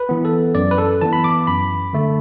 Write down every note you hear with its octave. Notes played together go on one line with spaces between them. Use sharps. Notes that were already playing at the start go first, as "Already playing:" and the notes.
Already playing: B4
E3 B3
A4
F#2 D5
B4
A4
E3 B3 A5
B5
D6
F#2 B5
D3 A3